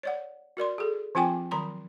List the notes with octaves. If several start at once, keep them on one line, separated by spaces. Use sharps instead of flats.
C#5 D5 F#5
F#4 A#4 D5 C6
G#4 A4
F3 C4 F4 G5 G#5 D6
D#3 F#3 A#5 C6